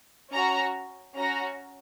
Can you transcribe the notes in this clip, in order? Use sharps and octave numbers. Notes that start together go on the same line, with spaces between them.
C#4 F#4 A#5
C#4 F#4 A#5